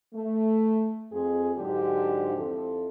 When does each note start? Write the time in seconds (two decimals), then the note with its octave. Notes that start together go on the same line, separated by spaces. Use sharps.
0.14 A3
1.13 F2 G#4
1.57 G#2 D3 F#3 D4 G4
2.37 F2 F3 E4 A4